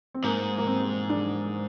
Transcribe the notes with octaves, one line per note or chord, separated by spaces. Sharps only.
C4
G#2 A#3
A#3
C4
D4